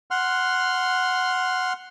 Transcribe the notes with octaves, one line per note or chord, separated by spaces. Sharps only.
F#5 C6 F6